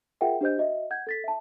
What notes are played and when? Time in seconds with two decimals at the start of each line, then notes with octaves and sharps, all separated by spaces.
0.21 F4 G#4 A#4 E5 F#5 G5
0.41 D4 G4 C5 D#5 G6
0.58 F#4 D#5 E5
0.90 F#5 G6 G#6
1.07 A4 A6 B6
1.24 E5 A5